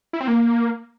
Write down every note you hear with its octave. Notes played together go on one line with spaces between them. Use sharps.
E4
C4
A#3